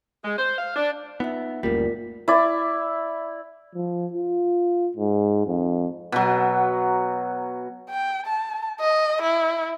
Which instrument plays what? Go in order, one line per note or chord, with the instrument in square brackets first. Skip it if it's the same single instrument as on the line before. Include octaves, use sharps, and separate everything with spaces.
[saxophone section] G#3
C5
F5
D4
[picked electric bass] B3 [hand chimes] D#4 F4 E5
[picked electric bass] F#1 C#2 G3 [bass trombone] A#2 [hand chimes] A3 A#4 B6
[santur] E4 D5
[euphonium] F3
F4
G#2
F2
[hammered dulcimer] B2 F#3
[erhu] G5
A5
D#5
E4